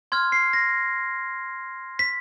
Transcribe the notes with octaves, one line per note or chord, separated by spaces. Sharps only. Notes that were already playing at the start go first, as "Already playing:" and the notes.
C6 F6 G#6
C7
A#6
B6